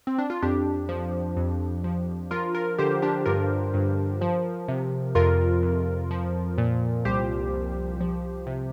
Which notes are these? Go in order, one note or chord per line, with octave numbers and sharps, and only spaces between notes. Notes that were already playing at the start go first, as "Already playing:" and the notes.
C4
D4
F4
F2 D4 G4
F3
F2
F3
F3 F4 A#4
F4 A#4
D3 G4 C5
D4 G4
G2 F4 A#4
G2
F3
C3
F2 F4 A#4
F2
F3
A#2
C2 G4 C5
C2
F3
C3